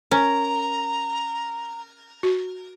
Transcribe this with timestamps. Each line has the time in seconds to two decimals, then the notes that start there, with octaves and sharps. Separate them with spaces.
0.11 C#4 A#4 A#5
2.23 F#4